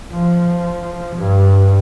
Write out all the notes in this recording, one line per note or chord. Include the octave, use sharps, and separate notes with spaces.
F3
G2